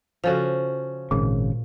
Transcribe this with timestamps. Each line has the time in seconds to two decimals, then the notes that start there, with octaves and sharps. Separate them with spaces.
0.24 C#3 F3 C#4 F#4 A4 F5
1.11 G#1 A#2 C#3